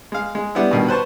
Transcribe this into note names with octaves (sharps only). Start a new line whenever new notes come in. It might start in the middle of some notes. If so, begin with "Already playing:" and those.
G#3 F5
G#3
G3 B3 D4 E4
G2 B2 D#3
B4 C5 A5 C#6